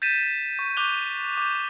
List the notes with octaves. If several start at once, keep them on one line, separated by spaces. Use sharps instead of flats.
G6 A6 B6 D#7 E7
C#6
C#6 D6 F#6 G6 F7 G7
D6 G6